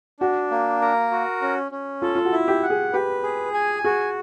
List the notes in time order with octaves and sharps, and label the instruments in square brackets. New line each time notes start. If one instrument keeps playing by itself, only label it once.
[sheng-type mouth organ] D4 [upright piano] F#4
[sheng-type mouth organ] A#3
A#4
F#4
C#4
C#4
[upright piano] F4 [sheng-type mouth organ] A4
[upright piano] F4
F#4
[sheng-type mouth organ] E4
[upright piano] G4
[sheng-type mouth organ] F#5
[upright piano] G#4
[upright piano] G4 [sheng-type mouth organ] B4
[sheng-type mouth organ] G#4
G#5
[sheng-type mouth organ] F#4 [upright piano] G#4